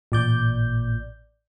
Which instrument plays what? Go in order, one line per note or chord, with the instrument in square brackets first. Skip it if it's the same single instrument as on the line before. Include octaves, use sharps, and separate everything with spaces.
[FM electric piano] A1 D5 G6 [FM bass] A#2